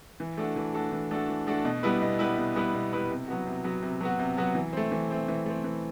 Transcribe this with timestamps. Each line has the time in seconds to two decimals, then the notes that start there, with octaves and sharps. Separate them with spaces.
0.20 E3
0.37 A3 D4 F#4 A4
0.56 E3
0.74 A3 D4 F#4 A4
0.92 E3
1.11 A3 D4 F#4 A4
1.28 E3
1.47 A3 D4 F#4 A4
1.65 B2
1.83 G3 B3 E4 B4
2.02 B2
2.19 G3 B3 E4 B4
2.38 B2
2.56 G3 B3 E4 B4
2.74 B2
2.93 G3 B3 E4 B4
3.11 C3
3.28 F#3 B3 F#4
3.47 C3
3.64 F#3 B3 F#4
3.82 C3
4.00 F#3 B3 F#4
4.19 C3
4.37 F#3 B3 F#4
4.55 E3
4.73 A3 C4
4.92 E3
5.10 A3 C4
5.28 E3
5.46 A3 C4
5.64 E3